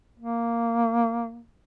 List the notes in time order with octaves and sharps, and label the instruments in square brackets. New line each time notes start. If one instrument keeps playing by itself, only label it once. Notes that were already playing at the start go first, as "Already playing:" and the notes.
[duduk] A#3